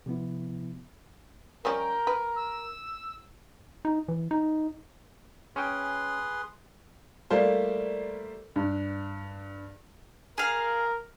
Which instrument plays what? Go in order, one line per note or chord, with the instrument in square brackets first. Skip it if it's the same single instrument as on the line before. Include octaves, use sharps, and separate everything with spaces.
[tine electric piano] C3 F3 B3 E4
[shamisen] F3 G3 C#4 [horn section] A#4 [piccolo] G5
[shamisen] B4
[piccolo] E6
[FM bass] D#4
E3
D#4
[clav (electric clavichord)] C#4 G5 [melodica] G#4 B4 C6
[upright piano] G3 A3 A#3 F4 C5
G2
[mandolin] G#4 F5 [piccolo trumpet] A#4